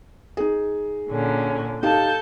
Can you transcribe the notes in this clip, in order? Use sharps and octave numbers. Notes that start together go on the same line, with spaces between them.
D#4 G#4
A#2 D3 C#4
D#4 G4 A4 F5 A5 G6